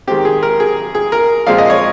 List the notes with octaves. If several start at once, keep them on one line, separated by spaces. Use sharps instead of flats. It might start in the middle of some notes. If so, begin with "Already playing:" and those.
D#3 G#3 C4 G4
G#4
A#4
G#4
G#4
A#4
A#2 F3 G#3 C4 F5
D#5
C#5